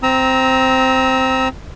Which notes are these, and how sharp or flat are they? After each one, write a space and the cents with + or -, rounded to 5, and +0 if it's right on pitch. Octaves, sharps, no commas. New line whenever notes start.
C4 +0 A#5 +10 E6 -30